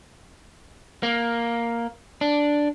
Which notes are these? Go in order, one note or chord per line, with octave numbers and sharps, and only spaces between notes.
A#3
D4